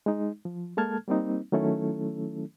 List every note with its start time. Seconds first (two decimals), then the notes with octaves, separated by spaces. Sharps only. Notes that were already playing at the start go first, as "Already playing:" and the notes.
0.06 G#3 D#4
0.45 F3
0.77 G#3 A#3 A4 A5 F6 G#6
1.08 G3 A#3 C4 D#4
1.52 D#3 F#3 A3 C#4 E4 A4